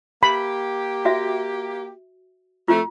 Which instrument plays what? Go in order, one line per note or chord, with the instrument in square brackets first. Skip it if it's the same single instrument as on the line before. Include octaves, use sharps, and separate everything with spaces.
[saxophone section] A#3 G4 [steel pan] B5
[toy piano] F#4 E5
[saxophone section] F2 A3 [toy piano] F4